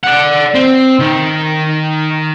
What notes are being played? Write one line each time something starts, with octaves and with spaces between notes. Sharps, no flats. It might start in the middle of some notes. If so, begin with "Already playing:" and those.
D5 F#5
C4
D#3